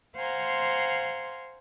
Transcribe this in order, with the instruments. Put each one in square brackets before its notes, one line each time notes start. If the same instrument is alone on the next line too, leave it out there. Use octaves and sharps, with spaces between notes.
[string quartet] C5 F5 F#5 G#5 A#5 C6